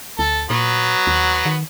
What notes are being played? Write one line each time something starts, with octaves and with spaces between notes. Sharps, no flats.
D2 A4
A#2 F#3 B3
D#2
D#3